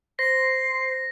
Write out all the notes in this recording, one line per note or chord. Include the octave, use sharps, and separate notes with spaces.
C5 A#6 C7